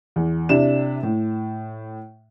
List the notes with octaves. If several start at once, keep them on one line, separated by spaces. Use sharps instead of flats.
E2
C3 D4 E4 E7
A2